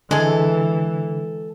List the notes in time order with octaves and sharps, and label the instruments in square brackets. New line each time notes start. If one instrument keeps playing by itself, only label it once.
[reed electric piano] D3 [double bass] E3 [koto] G#3 G#4 [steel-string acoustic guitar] A4